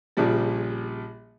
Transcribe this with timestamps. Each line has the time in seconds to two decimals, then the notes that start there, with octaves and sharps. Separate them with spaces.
0.17 A#1 A#2 C#3 F3 G3